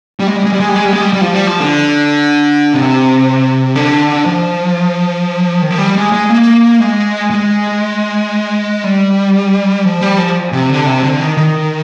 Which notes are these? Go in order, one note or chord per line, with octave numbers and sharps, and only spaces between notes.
G3
G#3
G3
G#3
G3
G#3
G3
G#3
G3
G#3
G3
G3
F3
G3
F3
D3
C3
D3
F3
D#3
F3
G3
G#3
G#3
A#3
G#3
G#3
G3
F3
G3
F3
C3
D3
C3
D3
D#3
D#3